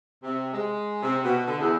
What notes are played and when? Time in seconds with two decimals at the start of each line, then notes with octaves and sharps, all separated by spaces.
0.23 C3
0.54 G#3
1.03 C3
1.24 B2
1.47 D3
1.60 E2